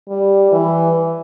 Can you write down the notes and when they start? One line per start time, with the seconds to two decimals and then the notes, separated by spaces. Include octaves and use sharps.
0.09 G3
0.51 E3